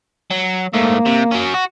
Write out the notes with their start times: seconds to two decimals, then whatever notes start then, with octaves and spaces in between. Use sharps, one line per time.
0.31 F#3
0.74 G#2 A3 A#3
1.06 C3
1.32 F#3 C#4
1.54 F#4